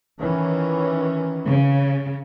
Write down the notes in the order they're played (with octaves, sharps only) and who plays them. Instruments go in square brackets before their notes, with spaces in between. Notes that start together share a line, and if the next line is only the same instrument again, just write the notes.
[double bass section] D#3 E3 C#4
[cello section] C#3